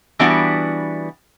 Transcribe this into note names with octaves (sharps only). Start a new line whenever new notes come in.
E3 G3 B3 D4 F#4